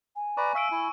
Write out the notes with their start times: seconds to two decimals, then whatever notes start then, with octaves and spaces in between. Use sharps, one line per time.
0.16 G#5
0.37 B4 D5 A#5 C#6
0.55 E5 F5 C#6 E6 D7
0.71 E4